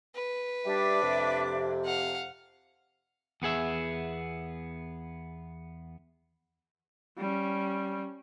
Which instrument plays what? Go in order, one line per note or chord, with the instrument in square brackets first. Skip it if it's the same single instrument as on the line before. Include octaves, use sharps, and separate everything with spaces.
[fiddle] B4
[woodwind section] G3 [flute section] D4 E5 D6
[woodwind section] F2 C3
[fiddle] F5 F#5
[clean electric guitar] E2 B3 G#4 E5
[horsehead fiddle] G3 C#4